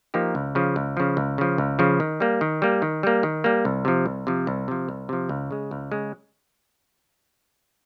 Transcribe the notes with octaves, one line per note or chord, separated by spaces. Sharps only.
F3 A#3 D#4 G4
C#2
C#3 F3
C#2
C#3 F3
C#2
C#3 F3
C#2
C#3 F3
D#3
G3 A#3
D#3
G3 A#3
D#3
G3 A#3
D#3
G3 A#3
C2
C3 F3
C2
C3 F3
C2
C3 F3
C2
C3 F3
C#2
C#3 G#3
C#2
C#3 G#3